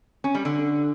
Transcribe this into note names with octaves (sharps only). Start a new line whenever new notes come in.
C#4
G3
D3